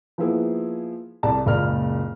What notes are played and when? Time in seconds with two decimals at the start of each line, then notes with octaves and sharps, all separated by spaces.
0.18 F3 A#3 B3 E4 G#4
1.23 C2 G#4 D5 A5
1.46 F#1 C#2 A#2 D5 F6